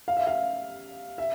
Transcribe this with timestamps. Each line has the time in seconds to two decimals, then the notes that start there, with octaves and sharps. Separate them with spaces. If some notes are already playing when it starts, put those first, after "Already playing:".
0.08 F5
0.17 E5
0.27 F5
1.18 E5